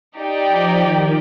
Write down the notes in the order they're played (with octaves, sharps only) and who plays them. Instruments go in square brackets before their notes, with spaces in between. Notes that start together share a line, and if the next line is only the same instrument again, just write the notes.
[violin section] D#4 G4 D5 G5
[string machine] F3
D#3